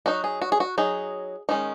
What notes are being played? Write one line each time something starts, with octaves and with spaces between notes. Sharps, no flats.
F#3 D#4 F#4
G#4
F#4
G#4
F#4
F#3 D#4 G#4
D#3 G#3 C#4 D#4